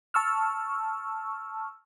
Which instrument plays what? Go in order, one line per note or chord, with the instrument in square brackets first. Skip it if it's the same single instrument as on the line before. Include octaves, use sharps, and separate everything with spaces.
[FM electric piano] A5 C#6 E6 F6